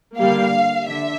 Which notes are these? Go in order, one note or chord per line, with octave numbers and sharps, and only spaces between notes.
D3 G3 A#3 F5
D3 E5